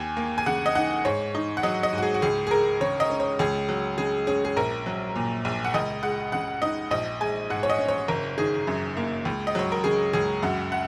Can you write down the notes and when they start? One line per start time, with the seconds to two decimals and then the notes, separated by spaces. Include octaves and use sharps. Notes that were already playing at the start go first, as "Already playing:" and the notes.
Already playing: D#2 G#5
0.17 A#3
0.38 G#5
0.46 C#3 F#5
0.66 D#5
0.75 D#4 F#5
1.05 G#2 C#5
1.35 D#4
1.57 F#5
1.63 F#3 D#5
1.83 D#5
1.93 G#2 F#4
2.02 G#4
2.14 F#4
2.22 C#2 G#4
2.47 G#4
2.51 G#3 A#4
2.80 C#3 C#5
3.00 D#5
3.10 C#4
3.20 C#5
3.39 C#2 G#4
3.69 F#3
3.98 C#3 G#4
4.27 C#4 G#4
4.45 G#4
4.56 A#1 A#4
4.86 F#3
5.16 A#2
5.45 A#1
5.64 F#5
5.74 C#2 D#5
6.03 G#3 F#5
6.32 C#3 F#5
6.62 D#4 D#5
6.91 A#1 D#5
7.20 G#3 G#5
7.50 G#2 F#5
7.63 C#5
7.70 D#5
7.79 C#4
7.88 C#5
8.08 F#1 A#4
8.38 D#3 G#4
8.67 F#2
8.97 A#3
9.25 C#2
9.47 D#5
9.55 F#3 C#5
9.72 A#4
9.84 C#3 G#4
10.13 C#2 G#4
10.43 F#2 F#4
10.72 F#5